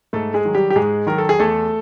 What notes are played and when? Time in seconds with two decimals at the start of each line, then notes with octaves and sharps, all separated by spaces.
0.13 G#2 A3 A4
0.34 G#3 G#4
0.45 D#3 F#3
0.55 G3 G4
0.70 G4
0.76 G#2 G#3 G#4
1.07 D#3 F#3 A#4
1.18 A4
1.29 G#4
1.39 E2 A3 A4